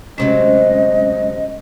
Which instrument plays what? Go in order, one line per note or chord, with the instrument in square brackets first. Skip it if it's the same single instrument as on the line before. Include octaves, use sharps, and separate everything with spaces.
[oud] D2 C3 F#3 [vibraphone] G#3 C#4 [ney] D#5